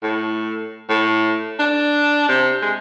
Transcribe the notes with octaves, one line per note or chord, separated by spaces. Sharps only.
A2
A2
D4
C3
G#3